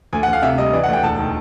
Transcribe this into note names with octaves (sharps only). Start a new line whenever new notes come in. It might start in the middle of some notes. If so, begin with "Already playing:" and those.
D2 G#5
F#5
D2
F5
C3 E5
G3 D#5
E3 D5
F#5
D2 G5
E1 A5
D#3